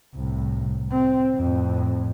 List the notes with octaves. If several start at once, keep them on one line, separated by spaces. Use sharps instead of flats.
C2 A2
C4
F2 A2